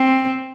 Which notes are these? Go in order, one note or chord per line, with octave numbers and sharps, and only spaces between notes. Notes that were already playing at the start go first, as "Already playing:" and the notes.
Already playing: C4